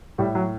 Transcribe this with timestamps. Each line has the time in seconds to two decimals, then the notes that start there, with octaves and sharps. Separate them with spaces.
0.18 A2 G3
0.35 F#3